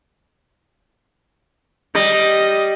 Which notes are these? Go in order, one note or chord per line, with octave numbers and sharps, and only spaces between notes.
G3 D#5